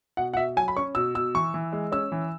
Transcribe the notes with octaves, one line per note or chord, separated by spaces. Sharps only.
B2 F#5
F#5
B2 E5
F#3 G#5
B5
C#4 C#6
B2 E6
B2 E6
E3 C#6
E3
G#3
C#4 E6
E3